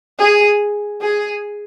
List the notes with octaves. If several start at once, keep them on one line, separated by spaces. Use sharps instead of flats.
G#4
G#4